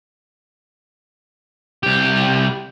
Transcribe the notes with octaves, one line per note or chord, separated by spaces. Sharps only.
C2 G4